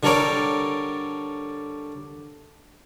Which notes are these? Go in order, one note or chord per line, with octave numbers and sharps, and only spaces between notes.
D3 G3 A4 A#4 C#5 D5